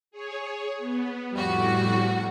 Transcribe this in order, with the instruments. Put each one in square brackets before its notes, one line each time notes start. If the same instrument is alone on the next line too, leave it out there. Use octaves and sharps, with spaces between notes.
[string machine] G#4 C#5
B3
[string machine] F2 A2 [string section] G3 F#4